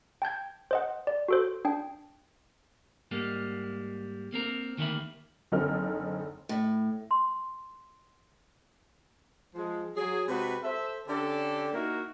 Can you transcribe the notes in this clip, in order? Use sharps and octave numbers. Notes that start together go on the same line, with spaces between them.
G5 A5 G6 G#6
C5 D#5 F#5
D5
F#4 A4 C5
D4 G5
G#2 G3 G#3 A#3
A#3 C4 A#4
D2 D#3 A#3 D5 E5 B5
F#1 D3 C4 D#4 A4 F6
A2
C6
F3 G#3
F#3 G#4
C3 G#3 F#4 B4
A4 C5 E5
D3 C#4 D4 G4 A4
A#3 D#4 E4 F#4 A#4